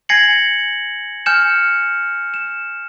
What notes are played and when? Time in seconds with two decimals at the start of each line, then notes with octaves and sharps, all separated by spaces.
0.09 G#5 G#6 A#6 C7 C#7 F#7
1.26 G#5 F6 G6 C#7 E7
2.34 E7